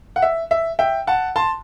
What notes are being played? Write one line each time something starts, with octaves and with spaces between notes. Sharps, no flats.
F#5
E5
E5
E5 G5
F#5 A5
A5 C6